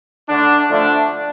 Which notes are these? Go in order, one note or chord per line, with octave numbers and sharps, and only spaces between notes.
D3 A3 D4
D3 F3 A3 D4